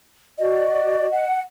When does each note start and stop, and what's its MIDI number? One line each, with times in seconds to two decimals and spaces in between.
0.38 1.08 66
0.38 1.08 74
0.38 1.25 75
1.11 1.41 78